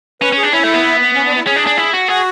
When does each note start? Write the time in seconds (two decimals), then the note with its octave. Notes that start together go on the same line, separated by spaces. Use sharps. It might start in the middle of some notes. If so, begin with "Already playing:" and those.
0.22 C#4 B4
0.32 C#4
0.38 G#4
0.43 D4
0.53 C#4 E4
0.64 A3
0.74 B3
1.15 C#4
1.26 D4
1.36 E4
1.47 C#4 G#4
1.56 D4
1.67 D4
1.77 E4
1.93 F#4
2.08 F#4 G#4